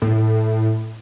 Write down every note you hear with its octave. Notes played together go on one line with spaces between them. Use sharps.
A2